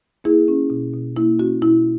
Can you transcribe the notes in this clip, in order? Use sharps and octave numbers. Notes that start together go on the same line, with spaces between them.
A#3 E4 G#4
C#4
B2
B2
A#3 E4
C#4 F#4
B2 E4